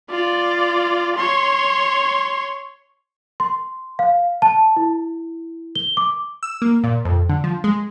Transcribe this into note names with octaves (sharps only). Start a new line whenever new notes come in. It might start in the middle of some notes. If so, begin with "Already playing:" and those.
F4 D5
C#5 C6
C6
F5
A5
E4
G7
D6
E6
A#3
A#2
F2
D3
F3
G#3